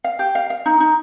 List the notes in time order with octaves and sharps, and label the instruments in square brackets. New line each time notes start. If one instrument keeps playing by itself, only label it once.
[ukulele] F5
G4
F5
F5
D#4
D#4